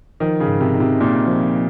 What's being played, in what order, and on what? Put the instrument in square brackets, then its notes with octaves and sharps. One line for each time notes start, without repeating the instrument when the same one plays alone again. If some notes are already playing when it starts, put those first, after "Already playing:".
[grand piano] D#3 [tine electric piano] F3
[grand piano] C#3
[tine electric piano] G#2
[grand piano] C3
[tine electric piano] D#4
[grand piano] C3
[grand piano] A#2 [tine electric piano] D#4
[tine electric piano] F3
F3